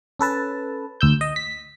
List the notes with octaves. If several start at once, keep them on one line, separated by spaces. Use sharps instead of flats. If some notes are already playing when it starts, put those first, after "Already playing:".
C#4 A4 B4 A5
D2 E6 G6
D#5
B6